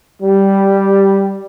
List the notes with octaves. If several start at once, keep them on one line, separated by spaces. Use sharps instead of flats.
G3